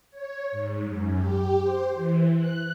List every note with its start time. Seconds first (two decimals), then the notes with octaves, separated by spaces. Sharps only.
0.11 C#5
0.52 G#2
0.84 F#2
1.15 G4
1.62 C5
1.95 E3
2.36 F#6